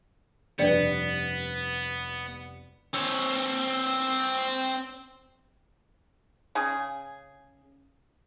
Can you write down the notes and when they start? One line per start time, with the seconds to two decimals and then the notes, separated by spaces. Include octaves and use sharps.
0.59 F1 G2 B3 D4 B4 D5 G5
2.94 C4 C#5
6.55 C#3 G#4